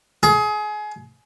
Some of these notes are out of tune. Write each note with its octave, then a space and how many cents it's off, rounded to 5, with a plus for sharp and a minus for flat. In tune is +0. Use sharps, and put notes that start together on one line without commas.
G#4 +25